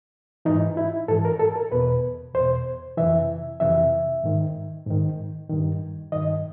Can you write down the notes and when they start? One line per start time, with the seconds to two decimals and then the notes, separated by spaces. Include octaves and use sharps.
0.45 G#2 E3 D#4
0.77 E4
1.08 G#2 A4
1.11 E3
1.25 A#4
1.39 A4
1.56 A#4
1.72 E2 B2 B4
2.34 E2 B2 C5
2.97 F2 C3 E3 E5
3.60 F2 C3 E3 E5
4.24 G#2 D#3
4.86 G#2 D#3
5.49 G2 D#3
6.12 G2 D#3 D#5